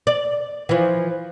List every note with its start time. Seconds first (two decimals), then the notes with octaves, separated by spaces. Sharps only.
0.07 D5
0.69 E3 F3